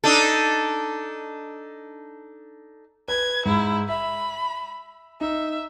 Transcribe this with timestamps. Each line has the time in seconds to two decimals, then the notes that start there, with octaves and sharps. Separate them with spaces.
0.04 D4 D#4 A4
3.08 B4 G#6
3.45 G#2 E4
3.89 E5 B5
5.21 D#4 E5